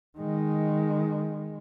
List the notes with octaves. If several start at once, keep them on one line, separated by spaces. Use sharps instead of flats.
D#3 G#3